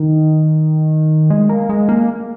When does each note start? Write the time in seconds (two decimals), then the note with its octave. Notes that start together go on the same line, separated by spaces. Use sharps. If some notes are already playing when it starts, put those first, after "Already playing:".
Already playing: D#3
1.30 G#3
1.49 A#3
1.69 G#3
1.89 A#3